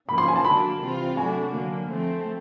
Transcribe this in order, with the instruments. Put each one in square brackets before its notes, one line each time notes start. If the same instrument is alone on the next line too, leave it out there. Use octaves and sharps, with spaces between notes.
[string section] C#3 F3 A#3 [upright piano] B5
[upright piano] C6
G#5
A5
[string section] D3 F#3 A#3 D4 [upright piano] B5
[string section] C3 E3 G3 C4 F4
[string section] F#3 A3 D4 F#4 [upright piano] G#5
[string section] D3 F#3 A#3
F3 A3 C4